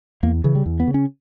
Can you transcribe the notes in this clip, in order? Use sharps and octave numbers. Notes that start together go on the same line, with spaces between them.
E2 A#3
C#3 E3
G3
E2
B3
C#3
C#4